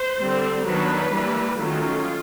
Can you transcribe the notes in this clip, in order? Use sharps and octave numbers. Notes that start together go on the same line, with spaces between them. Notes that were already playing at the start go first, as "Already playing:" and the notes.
Already playing: C5
D3 G3 C4
D#3 F#3 B3 D4 B4
E3 G3 A#3
D#3 F#3 A3 C#4 F4